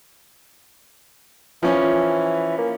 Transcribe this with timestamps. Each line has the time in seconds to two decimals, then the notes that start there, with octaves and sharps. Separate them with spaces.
1.63 E3 F3 C#4
2.58 A#3